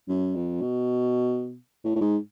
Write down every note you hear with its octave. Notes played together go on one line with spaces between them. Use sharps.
F#2
F2
B2
A2
A2
G#2